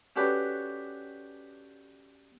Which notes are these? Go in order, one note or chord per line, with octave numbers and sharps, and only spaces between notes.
C#4 D4 F#4 G4 A4 B4